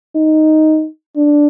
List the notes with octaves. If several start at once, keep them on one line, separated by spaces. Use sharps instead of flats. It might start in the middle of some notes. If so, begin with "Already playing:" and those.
D#4
D4